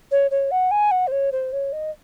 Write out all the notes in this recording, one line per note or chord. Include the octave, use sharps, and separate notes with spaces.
C#5
C#5
F#5
G#5
F#5
C5
C#5
C5
C#5
D#5